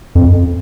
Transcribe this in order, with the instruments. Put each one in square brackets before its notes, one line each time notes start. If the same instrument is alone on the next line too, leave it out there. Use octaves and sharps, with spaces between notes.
[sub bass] F2